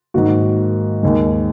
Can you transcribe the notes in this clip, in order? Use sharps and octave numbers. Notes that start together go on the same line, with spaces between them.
G#2 D#3 A#3 F#4
D#2 D#3 G#3